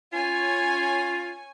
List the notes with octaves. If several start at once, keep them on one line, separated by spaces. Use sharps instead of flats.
C#4 F4 G#5